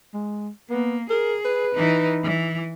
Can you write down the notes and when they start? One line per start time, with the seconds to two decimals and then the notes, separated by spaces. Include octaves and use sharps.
0.14 G#3
0.70 A#3 B3
1.10 G#4 A#4
1.45 B4
1.75 E3 D#4
2.24 E3